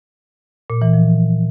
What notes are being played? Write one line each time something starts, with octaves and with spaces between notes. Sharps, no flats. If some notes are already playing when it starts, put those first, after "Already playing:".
A#2
E3
F3